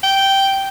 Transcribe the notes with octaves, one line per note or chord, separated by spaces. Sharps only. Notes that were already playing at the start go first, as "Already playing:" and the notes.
G5